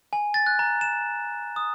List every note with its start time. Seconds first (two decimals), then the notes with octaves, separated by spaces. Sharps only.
0.13 G#5
0.34 A6
0.46 F#6
0.59 A#5
0.81 E7
1.56 D#6